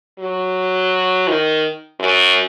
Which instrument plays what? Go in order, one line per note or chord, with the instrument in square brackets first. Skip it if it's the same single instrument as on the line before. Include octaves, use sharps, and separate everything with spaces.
[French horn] F#3
D#3
F#2